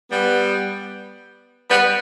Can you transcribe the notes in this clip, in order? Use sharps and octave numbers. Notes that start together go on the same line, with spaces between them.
G3 B3
G3 B3